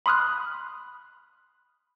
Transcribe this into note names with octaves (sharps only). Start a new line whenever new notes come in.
B5 C6 D#6 F6 F#6